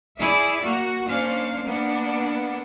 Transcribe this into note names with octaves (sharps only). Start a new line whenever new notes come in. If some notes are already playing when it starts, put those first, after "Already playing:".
E4 G#4 D5 E5
A#3 F#4
A#3 C#4 D4 C5 F5
A#3 B3 D4